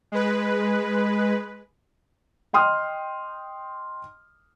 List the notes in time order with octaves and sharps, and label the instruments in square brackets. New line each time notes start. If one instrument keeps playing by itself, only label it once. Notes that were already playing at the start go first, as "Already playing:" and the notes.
[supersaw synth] G#3 B4
[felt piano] D#5 G5 C6 D#6 F6